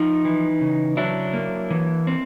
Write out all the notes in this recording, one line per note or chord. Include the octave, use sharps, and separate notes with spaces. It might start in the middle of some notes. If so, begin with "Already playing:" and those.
Already playing: F3 D#4
E3
C#3
F#3 D4 E4
A#3
E3
C4